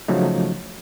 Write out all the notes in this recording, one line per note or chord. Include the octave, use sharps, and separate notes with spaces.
C#3 F3 F#3 A3 D#4